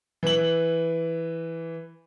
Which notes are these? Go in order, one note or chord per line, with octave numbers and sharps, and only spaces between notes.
E3 F#7